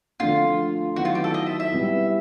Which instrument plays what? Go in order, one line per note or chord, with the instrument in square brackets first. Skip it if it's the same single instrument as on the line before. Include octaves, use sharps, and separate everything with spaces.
[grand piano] D3 F3 A3 D4 [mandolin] F4
[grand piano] D#3 F#3 B3 E4 [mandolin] F#4
[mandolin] F4
G4
A4
D#5
E5
E5
[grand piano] G3 B3 E4